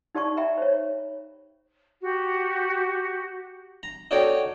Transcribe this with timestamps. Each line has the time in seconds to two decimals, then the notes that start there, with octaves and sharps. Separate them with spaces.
0.15 D#4 G4 D5 A5 C#6
0.37 E5 G5 A#5 B5
0.58 C5 C#5
2.02 F#4 G4
3.83 A#5
4.11 D#4 F#4 A4 C#5 D5 G5